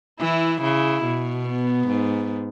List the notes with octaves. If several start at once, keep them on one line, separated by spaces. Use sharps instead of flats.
E3 E4
C#3 E4
B2
B3
G#2